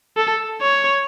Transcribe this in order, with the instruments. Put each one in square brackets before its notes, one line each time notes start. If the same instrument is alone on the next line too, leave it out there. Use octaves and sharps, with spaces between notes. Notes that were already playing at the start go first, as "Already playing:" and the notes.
[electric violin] A4
C#5